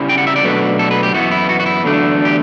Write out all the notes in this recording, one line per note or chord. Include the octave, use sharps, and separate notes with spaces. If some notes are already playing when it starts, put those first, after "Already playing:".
Already playing: C#3 G3 C#4 E4
G5
F#5
E5
D5
B2 F#3 A3 D4 B4
A4
B4
G4
F#2 E3 B3 E4 F#4
E4
F#4
F#4
E4
E2 D3 F#3 A3 D4
G4